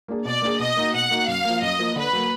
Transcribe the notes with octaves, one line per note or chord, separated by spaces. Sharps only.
A#3 D4 G#4
B2 D5
A#3 D4 G#4
B2 D#5
A#3 D#4 F#4
B2 F#5
A#3 D#4 F#4
F#2 F5
F3 A#3
F#2 D#5
F3 A#3
D3 B4
F#3 A#3